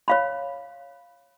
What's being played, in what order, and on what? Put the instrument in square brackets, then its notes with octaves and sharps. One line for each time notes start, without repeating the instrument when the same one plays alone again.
[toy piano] C#5 F5 B5